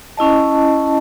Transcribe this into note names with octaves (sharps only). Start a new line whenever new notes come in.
C#4 E4 D#5 A5